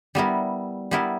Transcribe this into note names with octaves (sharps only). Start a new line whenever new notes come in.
G3 B3 E4 A#4
G3 B3 E4 A#4